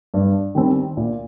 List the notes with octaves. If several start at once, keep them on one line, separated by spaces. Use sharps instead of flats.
G2
D#3 G3 C4
A#2